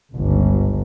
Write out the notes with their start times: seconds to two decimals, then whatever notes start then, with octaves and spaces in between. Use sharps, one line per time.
0.12 G1 C#2